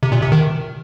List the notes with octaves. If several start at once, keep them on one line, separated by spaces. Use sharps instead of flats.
C3
A#2
C3
D#3